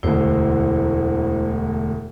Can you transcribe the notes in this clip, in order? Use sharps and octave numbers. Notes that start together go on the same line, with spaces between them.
E1 D2 E4 C5